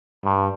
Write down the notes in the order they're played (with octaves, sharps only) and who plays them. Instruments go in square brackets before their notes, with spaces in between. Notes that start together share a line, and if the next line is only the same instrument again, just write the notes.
[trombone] G2